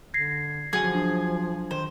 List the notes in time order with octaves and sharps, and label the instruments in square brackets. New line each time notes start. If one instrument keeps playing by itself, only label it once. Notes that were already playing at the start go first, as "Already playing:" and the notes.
[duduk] D3 [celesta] G#6 A#6 C7
[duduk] F3 [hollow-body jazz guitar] F#3 F#4 G#5 [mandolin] G#4 [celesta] G#6
[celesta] D4
[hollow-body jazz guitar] D#3 [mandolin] C5